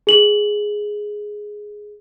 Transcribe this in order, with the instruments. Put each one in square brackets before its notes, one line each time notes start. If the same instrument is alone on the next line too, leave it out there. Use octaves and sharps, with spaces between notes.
[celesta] G#4 F#7